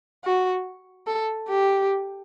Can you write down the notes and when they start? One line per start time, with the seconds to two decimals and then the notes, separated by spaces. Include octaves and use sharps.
0.24 F#4
1.07 A4
1.48 G4